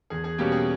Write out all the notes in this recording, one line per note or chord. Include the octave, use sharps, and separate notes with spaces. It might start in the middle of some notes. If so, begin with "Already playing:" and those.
E2 G#4
G#4
B2 G3 A#3 C#4 G4
G#4